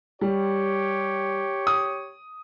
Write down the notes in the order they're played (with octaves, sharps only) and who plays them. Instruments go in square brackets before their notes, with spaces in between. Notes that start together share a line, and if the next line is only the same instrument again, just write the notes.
[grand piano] G3 [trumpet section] G4 C#5
[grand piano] D#6